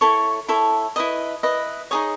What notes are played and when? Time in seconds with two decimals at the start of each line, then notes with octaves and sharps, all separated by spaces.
0.01 E4 A4 C#5 C#6
0.48 E4 A4 C#5
0.96 E4 B4 D#5 D#6
1.43 E4 B4 D#5
1.91 D#4 G#4 C#5 D#6